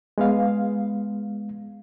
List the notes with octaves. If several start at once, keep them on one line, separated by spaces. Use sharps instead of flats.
G#3 B3 F5